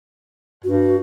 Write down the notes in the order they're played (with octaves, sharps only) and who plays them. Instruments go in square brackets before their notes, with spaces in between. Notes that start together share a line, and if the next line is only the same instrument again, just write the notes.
[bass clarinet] G2 [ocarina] F#4